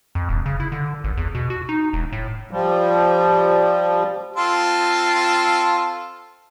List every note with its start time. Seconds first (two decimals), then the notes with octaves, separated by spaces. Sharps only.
0.15 F2
0.29 E1
0.46 C#3
0.60 E4
0.72 D3
1.04 G#1
1.17 E2
1.35 B2
1.50 F#4
1.69 D#4
1.93 E1
2.12 A2
2.51 F3 G3
4.36 C4 F4 A4